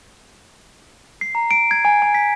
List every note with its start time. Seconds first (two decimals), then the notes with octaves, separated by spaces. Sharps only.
1.21 C7
1.35 A#5
1.51 D7
1.71 G#6
1.85 G#5
2.02 G#5
2.15 B6